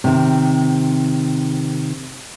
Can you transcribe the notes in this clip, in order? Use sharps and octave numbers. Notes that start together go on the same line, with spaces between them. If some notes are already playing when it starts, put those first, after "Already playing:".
C3 D#3